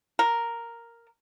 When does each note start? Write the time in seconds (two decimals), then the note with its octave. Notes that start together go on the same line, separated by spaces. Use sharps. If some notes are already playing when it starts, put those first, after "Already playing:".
0.19 A#4